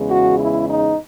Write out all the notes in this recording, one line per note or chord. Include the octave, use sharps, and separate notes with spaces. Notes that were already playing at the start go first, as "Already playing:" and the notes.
Already playing: E2 C#3 G#3
F#4
E4
D#4